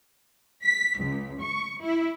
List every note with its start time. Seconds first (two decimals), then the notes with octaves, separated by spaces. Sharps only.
0.64 B6
1.00 C#2
1.41 C#6
1.81 E4